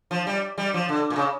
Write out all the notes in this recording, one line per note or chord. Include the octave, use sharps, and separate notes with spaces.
F3
G3
G3
F3
D3
A#2
C#3